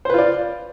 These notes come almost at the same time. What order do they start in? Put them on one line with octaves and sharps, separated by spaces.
C5 B4 F4 D5